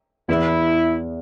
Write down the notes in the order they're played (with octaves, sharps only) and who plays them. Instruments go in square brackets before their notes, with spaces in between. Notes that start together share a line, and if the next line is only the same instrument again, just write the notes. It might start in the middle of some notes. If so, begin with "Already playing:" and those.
[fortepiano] E2 E3 B3 [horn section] E4